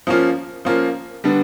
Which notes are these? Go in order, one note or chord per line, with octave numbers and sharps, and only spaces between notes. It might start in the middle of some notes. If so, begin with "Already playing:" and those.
F3 A#3 C#4 F4
F3 A#3 C#4 F4
D3 G3 B3 D4